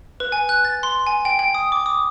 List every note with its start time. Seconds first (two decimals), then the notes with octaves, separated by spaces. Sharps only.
0.20 B4
0.32 G#5
0.49 F#6
0.65 A6
0.83 C6
1.07 G#5
1.25 G5
1.39 G5
1.55 D#6
1.72 D6
1.86 D#6